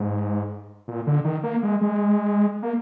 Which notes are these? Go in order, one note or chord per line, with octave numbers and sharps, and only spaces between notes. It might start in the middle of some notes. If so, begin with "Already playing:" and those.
Already playing: G#2
A#2
D3
D#3
A#3
G#3
G#3
A#3